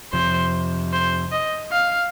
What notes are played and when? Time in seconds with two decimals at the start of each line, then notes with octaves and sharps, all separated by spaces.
0.13 F2 C3 F3 C5
0.93 C5
1.32 D#5
1.72 F5